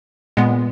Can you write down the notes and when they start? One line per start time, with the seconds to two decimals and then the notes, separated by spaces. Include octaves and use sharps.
0.37 A#2 G#3 B3